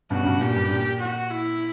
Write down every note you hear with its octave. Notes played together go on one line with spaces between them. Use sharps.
G2 B2 F#4
C#3
G2 B2
A#2 G4
G2
A#2
F#4
E4